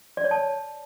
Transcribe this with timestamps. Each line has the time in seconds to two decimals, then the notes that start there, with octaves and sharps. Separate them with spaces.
0.17 D5
0.24 C#5
0.31 A5